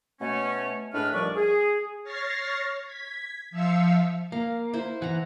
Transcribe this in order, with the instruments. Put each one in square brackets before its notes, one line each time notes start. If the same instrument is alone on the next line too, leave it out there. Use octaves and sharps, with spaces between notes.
[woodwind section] B2 A3 C#4
A2 G#3 A3 D4 B4 F6
D#2 A#2 F3 G3 D5 C#6
G#4
[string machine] C#5 C#6 F6 A6 A#6 C7
G#6 B6
F3 E5 F5 E6 C#7
[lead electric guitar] A#3 [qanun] F5
[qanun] E4 C5
[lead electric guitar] E3 [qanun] F#5 A#5